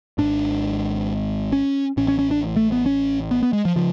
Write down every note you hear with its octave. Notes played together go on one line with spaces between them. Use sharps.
G#1 G#2 D4
C#4
A1 A2 C#4
C#4
C#4
D4
A3
B3
C#4
B3
B3
G#3
F3
C#3 F3